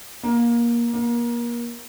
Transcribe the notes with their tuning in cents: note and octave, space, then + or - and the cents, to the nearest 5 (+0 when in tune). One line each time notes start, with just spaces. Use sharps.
A#3 +20
A#3 +30